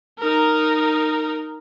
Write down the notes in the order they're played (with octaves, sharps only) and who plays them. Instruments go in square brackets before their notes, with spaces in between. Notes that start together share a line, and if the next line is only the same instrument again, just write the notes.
[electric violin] D#4 A#4